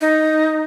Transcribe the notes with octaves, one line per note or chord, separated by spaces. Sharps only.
D#4